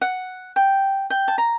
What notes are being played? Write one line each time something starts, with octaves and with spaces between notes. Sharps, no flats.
F#5
G5
G5
A5
A#5